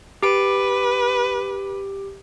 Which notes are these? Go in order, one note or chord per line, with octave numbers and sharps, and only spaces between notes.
G4 B4 D7